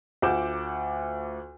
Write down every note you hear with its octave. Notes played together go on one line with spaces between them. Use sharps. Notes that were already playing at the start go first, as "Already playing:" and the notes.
D2 F4 F#5 D6 G6 E7